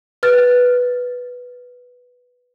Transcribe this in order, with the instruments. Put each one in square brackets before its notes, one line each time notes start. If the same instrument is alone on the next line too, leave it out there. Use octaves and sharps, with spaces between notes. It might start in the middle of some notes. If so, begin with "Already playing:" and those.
[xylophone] B4 F6 A6